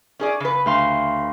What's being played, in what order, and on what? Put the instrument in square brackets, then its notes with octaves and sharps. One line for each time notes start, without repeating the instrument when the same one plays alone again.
[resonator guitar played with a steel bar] C#4 G#4 D5
C#3 B4
[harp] D2 F5 C6